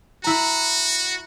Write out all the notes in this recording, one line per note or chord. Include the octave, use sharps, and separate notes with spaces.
E4 F#4 A#5